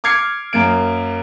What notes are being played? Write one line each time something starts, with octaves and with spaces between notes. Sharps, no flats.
D6 F6 G#6 C7 C#7
F#2 A#3 D7